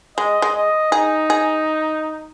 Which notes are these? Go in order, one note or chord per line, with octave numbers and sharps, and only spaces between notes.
G#3 D#5
G#3
D#5
D#4 G#4
G#4